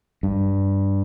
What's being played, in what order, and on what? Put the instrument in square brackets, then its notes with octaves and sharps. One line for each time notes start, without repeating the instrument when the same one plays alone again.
[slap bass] G2